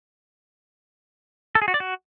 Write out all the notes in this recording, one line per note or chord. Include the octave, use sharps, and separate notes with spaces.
A4
G#4
F#4
D5
F#4